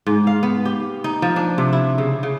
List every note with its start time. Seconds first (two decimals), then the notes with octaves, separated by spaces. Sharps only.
0.07 G#2
0.27 F5
0.43 B3
0.65 G4
1.04 D#4
1.22 F3
1.36 D4
1.58 C3
1.73 E4
1.98 C#3
2.23 C#3